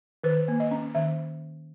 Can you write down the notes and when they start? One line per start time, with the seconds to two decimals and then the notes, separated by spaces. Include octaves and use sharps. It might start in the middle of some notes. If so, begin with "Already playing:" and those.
0.24 D#3 B4
0.48 A#3
0.60 D#5
0.71 C#4
0.95 D#3 E5